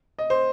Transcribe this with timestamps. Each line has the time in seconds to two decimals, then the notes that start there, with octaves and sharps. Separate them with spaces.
0.19 D#5
0.30 C5